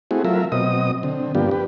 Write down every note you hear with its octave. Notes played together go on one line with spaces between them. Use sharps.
A3 C4 E4 F#4 G#4
F#3 A3 F4 A#4 E5
B2 F#3 C4 D#5 D#6
D3 C4
G2 F3 A#3 B3 D4 G4
G4 B4